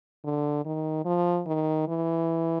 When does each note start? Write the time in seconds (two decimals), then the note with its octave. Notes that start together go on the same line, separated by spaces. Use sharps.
0.24 D3
0.65 D#3
1.05 F3
1.47 D#3
1.88 E3